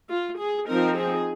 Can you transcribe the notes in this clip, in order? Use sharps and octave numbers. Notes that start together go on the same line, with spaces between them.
F4
G#4
F3 C4 D#4 A#4
G#4